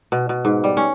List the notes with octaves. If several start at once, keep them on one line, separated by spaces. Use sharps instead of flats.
B2
B2
G#2
G3
C#4